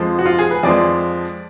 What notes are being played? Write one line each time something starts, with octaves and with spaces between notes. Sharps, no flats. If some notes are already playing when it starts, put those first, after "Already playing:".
Already playing: F2 F3 G#3
F#4
F4
G#4
B4
F2 F3 G#3 D5